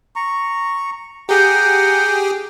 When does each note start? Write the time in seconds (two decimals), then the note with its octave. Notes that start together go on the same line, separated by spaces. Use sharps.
0.16 A#5 C#6
1.29 G4 G#4 F#5 A#5 G6